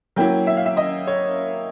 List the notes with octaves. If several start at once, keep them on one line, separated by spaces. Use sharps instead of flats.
F#3 A#3 C#4 E4 G5
E5
F5
E5
D#5
C#5